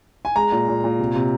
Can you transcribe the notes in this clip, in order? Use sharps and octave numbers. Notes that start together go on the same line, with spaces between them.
G#5
G#3 A#5
A#2
A#2
A#2
C3
C3